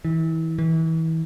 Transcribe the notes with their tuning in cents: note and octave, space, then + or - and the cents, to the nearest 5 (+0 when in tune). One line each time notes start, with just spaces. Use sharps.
E3 -30
E3 -30